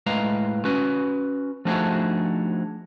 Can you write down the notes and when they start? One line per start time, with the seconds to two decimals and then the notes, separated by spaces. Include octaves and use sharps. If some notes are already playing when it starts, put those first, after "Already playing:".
0.06 A2 G#3 B4 F5 A#5
0.65 C#4 F#4 B4
1.65 F3 A3 D4 D#4 F#4 G#4